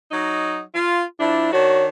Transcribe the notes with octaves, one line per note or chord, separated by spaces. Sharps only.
F#3 D#4
F4
F3 D4 E4
D#3 D4 F#4 C#5